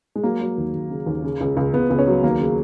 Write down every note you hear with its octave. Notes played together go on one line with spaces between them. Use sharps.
G#3
F#3 A#3
F#3
D#2
D#2
C#3
D#2
C#3
C#2
C#2
C#2 B3
C#2
C#4
F#3
D#2 A#3
C#3